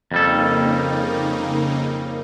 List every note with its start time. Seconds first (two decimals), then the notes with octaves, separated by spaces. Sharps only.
0.12 F2 C#3 G3 A#3 D#4 A4